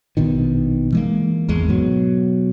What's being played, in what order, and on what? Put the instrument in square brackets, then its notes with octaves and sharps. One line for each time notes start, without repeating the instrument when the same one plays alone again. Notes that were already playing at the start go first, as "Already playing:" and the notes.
[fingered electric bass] A#1 B2 D#3
E3 G#3 A#3
G#1 E2 G#3
G#2 B2 F#3